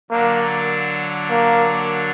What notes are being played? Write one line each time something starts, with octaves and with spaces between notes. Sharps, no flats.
D3 F#3 A#3 D4
A#3